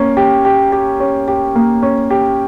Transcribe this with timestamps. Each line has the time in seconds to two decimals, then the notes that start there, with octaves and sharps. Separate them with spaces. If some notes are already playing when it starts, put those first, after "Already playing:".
Already playing: A#3 C#4
0.17 G4
0.45 G4
0.72 G4
1.00 C#4
1.28 G4
1.55 A#3
1.83 C#4
2.10 G4